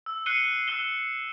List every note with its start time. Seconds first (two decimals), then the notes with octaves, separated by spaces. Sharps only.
0.06 E6
0.26 F#6 C7 C#7 D#7 G7
0.68 E6 F#6 C7 D#7 E7 G7